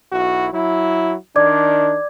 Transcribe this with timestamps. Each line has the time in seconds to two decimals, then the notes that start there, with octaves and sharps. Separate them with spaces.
0.13 B1 E4 F#4
0.53 F#3 E4
1.36 D#3 D4 D5 D6 G#6